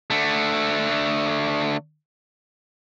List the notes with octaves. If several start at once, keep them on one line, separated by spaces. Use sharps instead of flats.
D3 A3